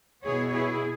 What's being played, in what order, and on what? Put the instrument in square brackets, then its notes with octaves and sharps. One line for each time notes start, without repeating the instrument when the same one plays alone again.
[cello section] B2 B3 E4 G#4 C#5
E4 G#4